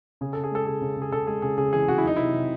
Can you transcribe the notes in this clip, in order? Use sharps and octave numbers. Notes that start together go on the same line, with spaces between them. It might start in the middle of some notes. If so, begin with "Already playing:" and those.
C#3 G#4
C#3 A4
G#4
G#3 A4
C#3 G#4
C#3
C#3
G#4
C#3 A4
G#3 G#4
C#3 G#4
C#3 G#4
E3 G#4
C#3 F#4
E4
F#3 D#4
C3 E4
C3